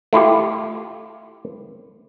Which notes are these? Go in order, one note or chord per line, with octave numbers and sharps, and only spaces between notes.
A3 E4 F4 G4